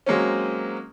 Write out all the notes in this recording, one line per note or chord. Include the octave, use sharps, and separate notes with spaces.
F#3 G#3 A#3 C4 C#4